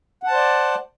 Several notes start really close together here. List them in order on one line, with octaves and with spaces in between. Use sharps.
F#5 A5 C5 D5